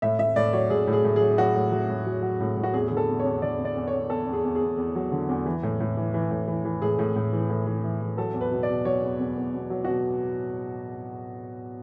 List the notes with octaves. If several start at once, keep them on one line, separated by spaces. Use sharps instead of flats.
A2 E5
A2 E5
A2 D5
F#3 C#5
A2 G#4
A2
G#4
A2
F#3 G#4
F#3 F#4
A2
F#3
A2
F#3
F#3
A2
A2
F#4
E2 G#4
D3 G#4
A4
E2
C#5
E2
D3 D5
E2
D5
E2
C#5
E2
E2 A4
E2
G#4
E2
G#4
E2
E2
F#3
D3
E2
E3
A2
A2
E3
E3
A2
E3
E3
A2 G#4
A2
A2
E3
A2
E3
E3
E3
F#3 A4
E2
B4
B2
D5
B2
F#3 C#5
E2
E2
E2
B2
F#3
B2 F#4